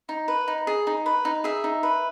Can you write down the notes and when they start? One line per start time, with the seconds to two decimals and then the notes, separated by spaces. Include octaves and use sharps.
0.09 D#4
0.28 B4
0.48 D#4
0.67 G#4
0.87 D#4
1.06 B4
1.25 D#4
1.44 G#4 E5
1.64 D#4
1.83 B4